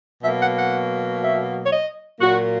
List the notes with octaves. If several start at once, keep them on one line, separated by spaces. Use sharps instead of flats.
B2 F#3 A#3 E5
F#5
F#5
E5
C#5
D#5
A#2 F#3 A#3 F#4